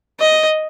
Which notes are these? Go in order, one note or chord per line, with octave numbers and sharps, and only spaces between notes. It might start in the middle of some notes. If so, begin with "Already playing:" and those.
D#5